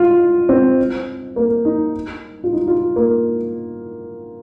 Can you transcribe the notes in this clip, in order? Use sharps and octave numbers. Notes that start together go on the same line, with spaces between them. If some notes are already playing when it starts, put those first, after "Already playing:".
Already playing: F4
C4
A#3
D#4
F4
D#4
F4
A#3